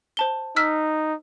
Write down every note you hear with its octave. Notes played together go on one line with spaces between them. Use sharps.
C5 A5 G7
D#4 E6 F6 B6